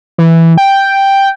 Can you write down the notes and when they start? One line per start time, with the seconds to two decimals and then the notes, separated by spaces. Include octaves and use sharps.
0.18 E3
0.58 G5